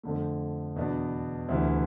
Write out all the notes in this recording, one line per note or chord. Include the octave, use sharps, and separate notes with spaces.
F2 D3 A3
E2 B2 B3 D4
D2 C3 E3